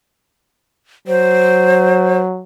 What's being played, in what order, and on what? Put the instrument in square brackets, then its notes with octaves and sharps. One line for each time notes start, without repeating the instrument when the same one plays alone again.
[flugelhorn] F#3 [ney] C5